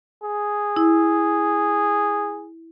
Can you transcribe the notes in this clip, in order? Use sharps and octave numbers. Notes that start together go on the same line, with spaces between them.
G#4
E4